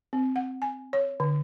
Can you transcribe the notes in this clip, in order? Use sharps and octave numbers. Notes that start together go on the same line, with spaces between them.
C4
F#5
G#5
C#5
D3